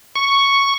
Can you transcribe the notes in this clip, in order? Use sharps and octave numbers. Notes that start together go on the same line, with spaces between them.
C#6